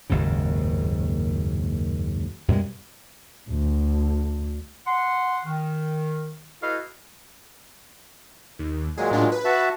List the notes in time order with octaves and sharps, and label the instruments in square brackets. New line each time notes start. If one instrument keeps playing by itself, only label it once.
[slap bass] F#1 D#2 G#2 C#3
F#2 B2 G3 G#3
[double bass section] D2
[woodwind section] F#5 C6
D#3
E4 F#4 A4 B4 D#5 F5
[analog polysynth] D#2
[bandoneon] A#2 F#3 G#3 [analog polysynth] G#4
[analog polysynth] A2 D4 F4
B4
[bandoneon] F#4 E5 A5